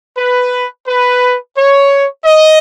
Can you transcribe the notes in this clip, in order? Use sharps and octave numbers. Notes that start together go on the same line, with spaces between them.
B4
B4
C#5
D#5